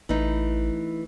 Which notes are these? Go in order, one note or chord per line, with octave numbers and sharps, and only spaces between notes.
A1 E3 A3 D#4